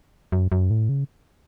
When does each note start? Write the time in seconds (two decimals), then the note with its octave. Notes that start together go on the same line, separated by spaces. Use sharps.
0.32 F#2
0.52 F#2
0.70 A2
0.89 C#3